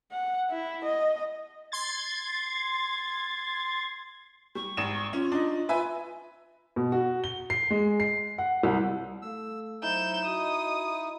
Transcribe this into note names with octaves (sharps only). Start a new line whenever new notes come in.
F#5
E4
D#5
C6 G#6 A6
G3 C#6
G#1 E7
C#4 F4
D4 D#4
F4 B4 E5 G#5
B2
F#4
G7
C7
G#3
C7
F#5
C2
A3 A4 F5 E6
F#3 D#4 E4 C5 G6 E7
F#4 D#5 D#6